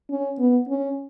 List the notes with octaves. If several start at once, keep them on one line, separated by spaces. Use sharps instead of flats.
C#4
B3
C#4